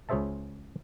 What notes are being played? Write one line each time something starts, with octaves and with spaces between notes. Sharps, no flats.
C#2 C#4 G#4 C5 E5 A5